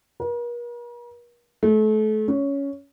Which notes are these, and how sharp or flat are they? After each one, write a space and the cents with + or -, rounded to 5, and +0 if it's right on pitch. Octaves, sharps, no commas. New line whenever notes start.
A#4 +45
A3 -35
C#4 +10